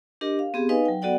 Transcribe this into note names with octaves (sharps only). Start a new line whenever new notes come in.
D4 G4 A#4 D#5
F5
B3 C4 G4 G#4
D#4 B4 D#5 F5 G#5
F#3 G5
B3 F#4 A4 D5 F#5 G5